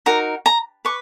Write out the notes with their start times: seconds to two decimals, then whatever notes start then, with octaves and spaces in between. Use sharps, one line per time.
0.06 D#4 F#4 A#4 A#5
0.46 A#5
0.85 B4 C#6